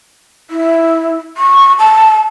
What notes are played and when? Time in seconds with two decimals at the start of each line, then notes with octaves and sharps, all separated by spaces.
0.50 E4
1.37 C#6
1.79 A5